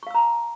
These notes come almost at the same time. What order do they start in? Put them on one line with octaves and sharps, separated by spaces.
C#6 F5 E6 A#5 A5